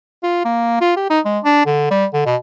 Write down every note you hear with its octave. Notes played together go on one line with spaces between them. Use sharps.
F4
A#3
F4
G4
D#4
G#3
D4
D3
G3
D3
B2